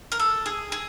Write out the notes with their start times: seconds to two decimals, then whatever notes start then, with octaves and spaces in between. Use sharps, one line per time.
0.12 A#4
0.20 A4
0.46 G#4
0.72 G#4